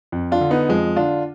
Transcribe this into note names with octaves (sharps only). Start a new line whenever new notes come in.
F2
D4 F4
D3
B3 D#4
F2 F3 G#3
D3 D4 F4